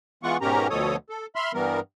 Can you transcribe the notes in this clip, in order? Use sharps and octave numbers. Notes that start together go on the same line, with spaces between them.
E3 G#3 B3 F4 F#5 C#6
G#2 B2 C#4 G4 A#4 A#5
D2 B2 F3 A4 C#5 D#6
A4
E5 B5 C6 F6
G2 E3 G3 B3 A#4